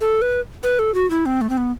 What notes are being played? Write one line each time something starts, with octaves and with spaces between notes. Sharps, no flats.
A4
B4
B4
A4
F#4
E4
C4
A3
C4
B3